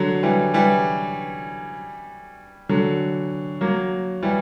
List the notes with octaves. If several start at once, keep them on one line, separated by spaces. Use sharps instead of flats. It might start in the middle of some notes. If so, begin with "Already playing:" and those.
Already playing: D3 F#3
E3 G3
E3 G3
D3 F#3
F#3 A#3
E3 G3